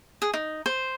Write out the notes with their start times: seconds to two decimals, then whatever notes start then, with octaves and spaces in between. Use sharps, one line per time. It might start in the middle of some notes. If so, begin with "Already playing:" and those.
0.22 G#4
0.34 D#4
0.66 C5